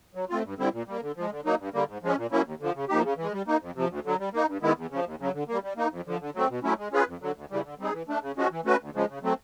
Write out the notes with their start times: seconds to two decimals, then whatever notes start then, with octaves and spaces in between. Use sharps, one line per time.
0.15 F#3
0.29 A3 C4 F4
0.44 G2
0.58 D3 G3 C4 E4
0.73 A#2
0.87 G3 A#3
1.02 D3
1.16 F3 G#3
1.31 D3
1.45 F#3 A#3 D#4
1.59 G2
1.73 D3 G3 A#3
1.88 G#2
2.03 F3 G#3 C#4
2.17 A#2
2.32 F#3 A#3 C#4 E4
2.45 D#2
2.60 D3 F3
2.75 C#3
2.89 F3 A#3 D#4 G4
3.04 C#3
3.17 E3
3.23 G#3
3.32 G3
3.47 A#3 D#4
3.61 F2
3.75 C3 F3
3.90 D2
4.05 D3 F#3
4.19 G3
4.33 A#3 D#4
4.48 G2
4.62 D#3 G#3 B3 E4
4.77 E2
4.90 C#3 F3
5.05 D#2
5.19 C#3 F#3
5.34 D3
5.48 G3 A#3
5.63 G3
5.77 A#3 D#4
5.91 F2
6.06 D3 F3
6.20 D3
6.35 F#3 A3 C4
6.50 B2
6.63 F#3 A3 C#4 E4
6.78 G#3
6.92 C#4 F4 G#4 B4
7.07 F2
7.22 D3 F#3
7.35 D2
7.50 C#3 E3 G3
7.65 D3
7.79 G3 C4 D#4 G#4
7.93 E3
8.08 A3 D4
8.22 C#3
8.37 F3 G#3 C#4 F#4
8.51 E3
8.65 A3 C#4 F#4 B4
8.80 D2
8.94 C#3 F3 G#3
9.09 C#3
9.23 F#3 A3 C4